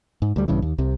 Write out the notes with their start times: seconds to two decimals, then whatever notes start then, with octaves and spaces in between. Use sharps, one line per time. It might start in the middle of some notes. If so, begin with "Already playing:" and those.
0.22 G#2
0.36 D2 G3
0.48 A#1 G2 C#3 E3
0.62 D#2
0.78 C2 C3